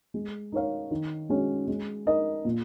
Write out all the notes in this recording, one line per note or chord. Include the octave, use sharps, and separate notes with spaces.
G#3
D#4 A#4 C#5 F5
D#3
G#3 C#4 F#4
G#3
D#4 A#4 D#5
A#2